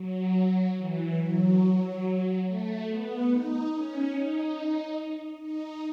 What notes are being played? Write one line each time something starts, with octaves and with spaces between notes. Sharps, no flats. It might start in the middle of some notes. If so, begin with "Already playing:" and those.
Already playing: F#3
E3
F#3
A3
B3
D#4
C#4
D#4
D#4